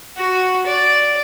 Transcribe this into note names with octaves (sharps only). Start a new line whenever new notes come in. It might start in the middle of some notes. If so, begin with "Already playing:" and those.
F#4
D5